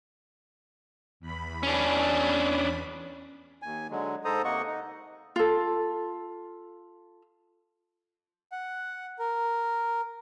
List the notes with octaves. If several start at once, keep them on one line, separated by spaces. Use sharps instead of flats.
E2 B5
C#4 D4
D#2 G#5
D3 F#3 G#3
G#2 A4 C5 A#5 D#6
C3 A#3 D#5 F#5 C#6
D#4
F4 A4
F#5
A#4